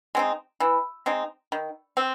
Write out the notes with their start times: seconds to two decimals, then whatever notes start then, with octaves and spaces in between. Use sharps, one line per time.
0.15 G#3 C4 D#4
0.60 E3
1.06 G#3 C4 D#4
1.52 D#3
1.97 C4